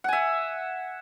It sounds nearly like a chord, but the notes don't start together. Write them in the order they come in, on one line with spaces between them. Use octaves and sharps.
F#5 G#5 E5